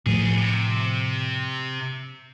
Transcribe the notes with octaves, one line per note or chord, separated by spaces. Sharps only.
A2 F3 B3 G#4
C3